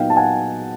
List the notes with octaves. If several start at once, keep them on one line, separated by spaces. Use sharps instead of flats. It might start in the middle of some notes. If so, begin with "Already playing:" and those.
Already playing: A#2 F#3 B3 D#4 F5 G5
A5
F#5 G#5